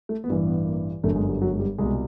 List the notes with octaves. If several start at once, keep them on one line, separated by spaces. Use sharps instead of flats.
A3
B3
A1 G2 E3 A#3
B3
A#3
G1 F#2 D3 A3
G#3
G3
F#3
G#3
G3
C2 G#3
B2